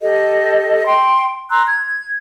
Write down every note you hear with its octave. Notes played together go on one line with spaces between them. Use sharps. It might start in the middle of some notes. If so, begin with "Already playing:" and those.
G4 A4 D#5
G5 C6
A#5 C6 E6 F#6
G#6